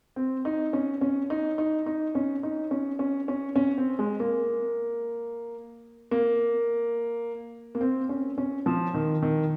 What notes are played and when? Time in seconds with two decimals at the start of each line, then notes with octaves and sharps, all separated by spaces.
0.16 C4
0.45 D#4
0.73 C#4
1.01 C#4
1.30 D#4
1.58 D#4
1.86 D#4
2.15 C#4
2.43 D#4
2.71 C#4
2.99 C#4
3.28 C#4
3.56 C#4
3.78 C4
3.99 G#3
4.20 A#3
6.11 A#3
7.75 A#3
7.81 C4
8.09 C#4
8.38 C#4
8.66 F3
8.94 D#3
9.22 D#3